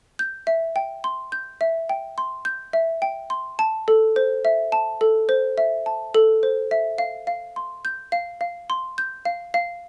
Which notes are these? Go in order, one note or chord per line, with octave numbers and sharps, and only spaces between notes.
G6
E5
G5
C6
G6
E5
G5
C6
G6
E5
G5
C6
A5
A4
C5
E5
A5
A4
C5
E5
A5
A4
C5
E5
F5
F5
C6
G6
F5
F5
C6
G6
F5
F5